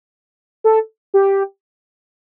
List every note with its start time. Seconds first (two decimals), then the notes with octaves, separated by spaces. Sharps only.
0.64 A4
1.14 G4